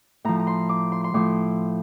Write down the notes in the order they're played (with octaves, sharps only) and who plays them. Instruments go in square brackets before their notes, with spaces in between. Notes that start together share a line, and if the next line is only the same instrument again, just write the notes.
[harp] A2 F3 A#5
A#5
C6
D6
C6
C6
A2 F3 D6